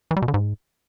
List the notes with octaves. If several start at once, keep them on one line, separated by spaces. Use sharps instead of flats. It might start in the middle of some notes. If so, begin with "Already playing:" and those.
E3
G3
B2
D3
G#2